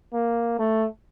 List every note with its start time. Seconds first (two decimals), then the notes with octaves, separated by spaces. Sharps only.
0.13 A#3
0.59 A3